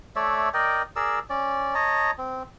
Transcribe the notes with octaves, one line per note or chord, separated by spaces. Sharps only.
A3 C#5 D5 E5
A#4 D5 D#5 G5
G#4 A#4 D5 E6
C#4 D5
C#5 D#5 A5 A#5
C4